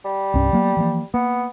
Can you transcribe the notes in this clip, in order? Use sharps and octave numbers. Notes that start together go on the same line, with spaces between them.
G3
C2 G2 C#4
F#3 A#3 B3
E3 F3 A#3
A#3 B3